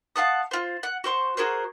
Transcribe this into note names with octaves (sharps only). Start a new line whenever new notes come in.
F5 F#5 A5 D#6
F4 C5
F#5
F#4 C5 C6 C#6
F#4 G#4 A#4 C5